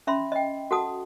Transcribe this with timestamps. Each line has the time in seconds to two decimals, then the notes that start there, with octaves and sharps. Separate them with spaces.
0.07 C#4 E5 B5 C6
0.32 D#5 G5
0.71 F#4 A4 F#5 A5 D#6